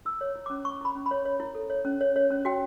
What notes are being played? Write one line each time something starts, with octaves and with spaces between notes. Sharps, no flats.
E4 E6
C#5
E4
C#4 D6
C#4 C#6
E4 B5
C#4
C#5 B5
C#5
E4
A4
C#5
C#4
C#5
C#5
C#4
F#4 G5